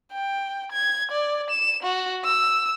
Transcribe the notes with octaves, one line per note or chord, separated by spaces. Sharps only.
G5
G#6
D5
E7
F#4
E6